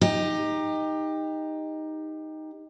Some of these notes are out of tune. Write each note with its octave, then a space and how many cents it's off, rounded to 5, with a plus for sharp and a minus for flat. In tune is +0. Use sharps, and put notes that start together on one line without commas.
D#4 +0 G4 +25